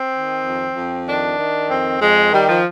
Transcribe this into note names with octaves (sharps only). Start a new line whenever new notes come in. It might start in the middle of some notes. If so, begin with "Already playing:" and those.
Already playing: C4
D#3
F2
F2
D#3 D4
D#3
F2 C4
F2 G#3
D#3 G3
F3